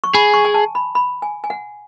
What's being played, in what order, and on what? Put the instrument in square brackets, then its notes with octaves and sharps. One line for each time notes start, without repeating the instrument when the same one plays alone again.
[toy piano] C#6
[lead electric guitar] G#4 [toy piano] B5
[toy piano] C#6
G#5
A5
B5
B5
G#5
G#5
F#5